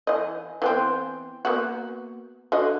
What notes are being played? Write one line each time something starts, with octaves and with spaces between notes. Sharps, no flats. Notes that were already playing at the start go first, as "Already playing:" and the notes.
E3 D#5
E3 B3 C4
A#3 B3 F#4
D3 F#4 D#5